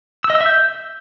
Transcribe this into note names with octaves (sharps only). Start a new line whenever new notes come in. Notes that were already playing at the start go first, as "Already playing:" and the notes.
E6
D#5
E6
E5
G6